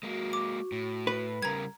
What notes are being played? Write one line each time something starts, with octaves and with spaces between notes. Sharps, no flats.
G#3 A#3 F#4
D6
A2
B4
C#3 G3 A#4 A#5 G#6